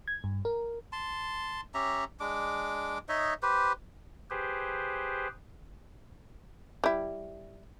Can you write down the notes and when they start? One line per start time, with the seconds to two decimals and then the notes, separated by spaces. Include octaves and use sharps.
0.08 G#6
0.24 G2
0.45 A#4
0.93 A5 C6
1.74 C#4 G4 E5 A#5
2.20 G#3 D4 D6
3.09 D#4 C#5 D#5 E5
3.43 G4 B4 C5
4.30 G4 G#4 B4 C5
6.84 G3 E4